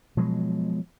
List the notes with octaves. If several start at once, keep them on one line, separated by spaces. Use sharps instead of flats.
B2 F3 F#3 G#3